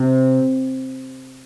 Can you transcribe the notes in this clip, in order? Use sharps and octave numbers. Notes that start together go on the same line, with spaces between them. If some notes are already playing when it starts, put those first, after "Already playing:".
Already playing: C3